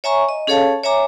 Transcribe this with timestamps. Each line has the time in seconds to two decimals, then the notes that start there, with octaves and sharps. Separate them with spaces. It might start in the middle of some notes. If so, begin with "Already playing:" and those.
0.04 C#5 E5 G#5 A#5 C#6
0.29 D#5
0.47 C#4 G#4 A4 C#5 F5 A5
0.83 C#5 E5 G#5 A#5 D6